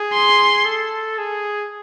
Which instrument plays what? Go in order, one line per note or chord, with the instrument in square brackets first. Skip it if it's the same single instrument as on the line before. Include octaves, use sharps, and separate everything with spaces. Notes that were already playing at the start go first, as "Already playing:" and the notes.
Already playing: [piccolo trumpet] G#4
[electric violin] C6
[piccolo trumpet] A4
G#4